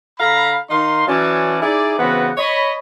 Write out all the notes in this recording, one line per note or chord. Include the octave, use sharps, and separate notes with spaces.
D3 A4 F5 A#5 B5
D#3 D#4 F5 C6
E3 F#3 C#4 C#5 D5 A5
D#4 E4 G#4 D5
C#3 E3 B3 C4 F#4 B4
C#5 D#5 B5